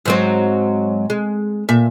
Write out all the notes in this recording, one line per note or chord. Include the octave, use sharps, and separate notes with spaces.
G#2 F#3 C4
G#3
A#2 E5